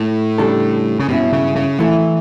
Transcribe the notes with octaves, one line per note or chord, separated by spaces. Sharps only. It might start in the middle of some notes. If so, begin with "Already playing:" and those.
Already playing: A2
C#3 G3 D4 A4
C#3
G2 B2 F#3 C#4 E4
C#3
C#3
E3 F#3 A3 E4